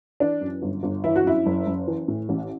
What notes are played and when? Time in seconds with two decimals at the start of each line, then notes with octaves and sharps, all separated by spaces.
0.20 E3 D4
0.41 F#2
0.62 G1
0.83 G1
1.04 E3 E4
1.16 F#4
1.25 F#2 E4
1.46 F#1
1.67 F#1
1.87 E3
2.08 A2
2.29 A1